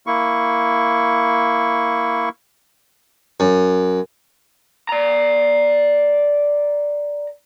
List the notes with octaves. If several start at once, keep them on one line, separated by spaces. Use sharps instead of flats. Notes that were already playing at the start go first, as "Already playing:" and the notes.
A#3 E4 C#6
F#2
D5 A#5